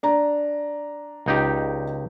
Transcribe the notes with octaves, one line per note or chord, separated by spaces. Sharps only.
D4 A#5
C#2 D#4 G4